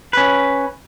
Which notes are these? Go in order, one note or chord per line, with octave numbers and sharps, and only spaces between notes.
C#4 B4